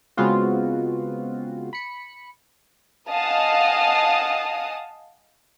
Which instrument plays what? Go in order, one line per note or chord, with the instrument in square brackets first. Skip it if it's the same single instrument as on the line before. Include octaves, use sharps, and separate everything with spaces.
[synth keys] C#3 G#3 B3 C4 F4 F#4
B5 C#7
[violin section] D#5 F5 F#5 G#5 A5 D#6